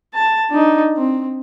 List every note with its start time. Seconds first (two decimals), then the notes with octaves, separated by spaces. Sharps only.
0.14 A5
0.50 D4 D#4
0.97 C4